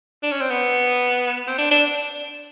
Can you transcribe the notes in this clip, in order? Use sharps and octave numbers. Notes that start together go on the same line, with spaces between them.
D4
C#4
C4
B3
C4
D4
D4